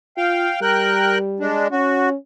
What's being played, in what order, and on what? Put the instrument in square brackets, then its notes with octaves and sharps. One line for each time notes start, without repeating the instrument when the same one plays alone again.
[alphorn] F4 [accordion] F5 G5
[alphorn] G3 [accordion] A#4 G5 F#6
[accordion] G#3 D4
[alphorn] C#4 [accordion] F#4